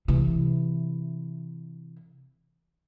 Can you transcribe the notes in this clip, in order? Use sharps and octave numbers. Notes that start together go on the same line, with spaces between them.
C3 E3